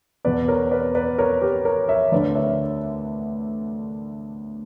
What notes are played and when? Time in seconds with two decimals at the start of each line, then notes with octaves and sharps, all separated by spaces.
0.25 E2 B2 B4 D5
0.48 A#4 C#5
0.71 B4 D5
0.95 B4 D5
1.18 A#4 C#5
1.42 G4 B4
1.65 A#4 C#5
1.88 C#5 E5
2.12 D2 D3 B4 D5
2.35 C#5 E5